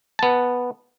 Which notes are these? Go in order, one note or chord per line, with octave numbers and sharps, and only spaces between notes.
B3 A5